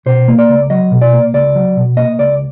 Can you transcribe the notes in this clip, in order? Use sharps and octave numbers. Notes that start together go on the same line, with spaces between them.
B2 C5
A#3
D5
C#2
F#3 D#5
B2
D5
A#3
C#2 D5
F#3
B2
A#3 D#5
C#2 D5